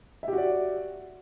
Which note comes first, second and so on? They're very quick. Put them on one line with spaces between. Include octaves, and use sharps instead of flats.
E5 G4 F#4 D5